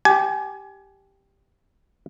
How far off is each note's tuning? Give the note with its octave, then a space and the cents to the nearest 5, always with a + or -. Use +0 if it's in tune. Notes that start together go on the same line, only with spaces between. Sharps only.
G4 +0 G#5 +25